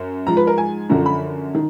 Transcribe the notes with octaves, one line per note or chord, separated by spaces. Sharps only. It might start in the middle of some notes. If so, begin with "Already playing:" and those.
Already playing: F#2
G#2 F3 A#5
B4
A#4
G#5
F#2 D3 F3 A#5
B5
D#3